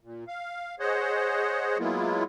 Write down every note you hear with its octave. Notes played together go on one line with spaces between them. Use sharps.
A#2
F5
G#4 C5 C#5 D#5 F#5
F#3 G#3 A#3 B3 E4 F4